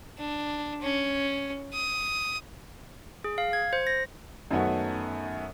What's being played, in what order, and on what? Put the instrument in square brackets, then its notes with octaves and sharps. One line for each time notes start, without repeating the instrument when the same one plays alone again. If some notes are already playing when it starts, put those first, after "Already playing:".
[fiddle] D4
C#4
D#6
[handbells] G#4
F5
G#6
C5
A#6
[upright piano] F#2 D#3 A3 B3 C#4 F#4